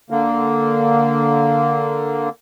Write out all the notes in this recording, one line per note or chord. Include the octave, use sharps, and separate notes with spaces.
D3 A#3